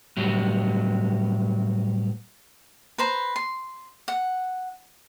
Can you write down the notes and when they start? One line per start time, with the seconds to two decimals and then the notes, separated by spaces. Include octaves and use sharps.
0.17 A2 F#3 G3
2.98 B4 C5 A#5
3.36 C6
4.08 F#5